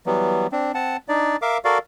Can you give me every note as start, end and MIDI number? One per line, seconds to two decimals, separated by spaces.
0.06 0.47 52
0.06 0.47 54
0.06 0.47 55
0.06 0.47 59
0.52 0.72 60
0.52 0.72 62
0.75 0.97 60
0.75 0.97 78
0.75 0.97 81
1.09 1.36 62
1.09 1.36 63
1.09 1.36 74
1.42 1.58 70
1.42 1.58 76
1.42 1.58 77
1.42 1.58 86
1.65 1.78 66
1.65 1.78 69
1.65 1.78 70
1.65 1.78 74
1.65 1.78 77